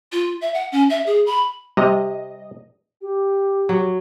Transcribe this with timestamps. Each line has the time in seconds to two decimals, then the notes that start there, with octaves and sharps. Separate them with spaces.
0.12 F4
0.41 E5
0.54 F#5
0.72 C#4
0.90 E5
1.06 G#4
1.26 B5
1.77 C3 G3 D#5
3.01 G4
3.69 F#3